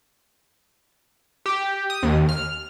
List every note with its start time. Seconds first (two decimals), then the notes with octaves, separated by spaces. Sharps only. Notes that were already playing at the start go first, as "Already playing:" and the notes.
1.46 G4
1.90 D#6
2.03 D#2
2.29 F6